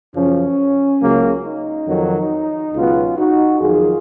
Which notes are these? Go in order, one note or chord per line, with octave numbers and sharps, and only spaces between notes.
F#2 C#3 F3 C#4
C#2 C#3 F#3 A#3
D#4
F2 D#3 F#3
C#2 B2 F#3 B3 C#4 F4
D#4 F#4
F2 D#3 F#3 F4 G#4